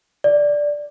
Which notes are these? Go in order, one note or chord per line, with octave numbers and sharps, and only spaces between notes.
D5